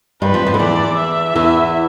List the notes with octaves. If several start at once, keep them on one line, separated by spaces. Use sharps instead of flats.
G2 G3 B4
F2 F3
F2 F3
D3
E2 E3 D5
E5
E2 E3